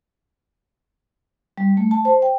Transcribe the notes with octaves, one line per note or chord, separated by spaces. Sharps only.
G3
A3
A5
C5
G5